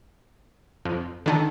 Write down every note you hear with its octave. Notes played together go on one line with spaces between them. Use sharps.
F2
D3 D#3 A4